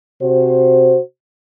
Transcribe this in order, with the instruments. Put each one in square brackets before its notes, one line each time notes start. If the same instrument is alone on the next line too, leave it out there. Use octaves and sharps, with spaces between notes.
[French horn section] C3 F#4 C5